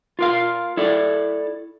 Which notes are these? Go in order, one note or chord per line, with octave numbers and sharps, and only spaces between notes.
F4 A#4 F5
E4 A4 D5